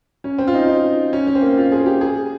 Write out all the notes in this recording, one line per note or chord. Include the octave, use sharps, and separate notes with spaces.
C#4
C4
F4
D#4
D#4
C#4
C#4
C4
A#3
F4
G#4
G4
G#4